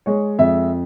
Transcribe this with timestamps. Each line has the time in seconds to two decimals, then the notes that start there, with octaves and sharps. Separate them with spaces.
0.06 G#3 C#5
0.39 F2 E5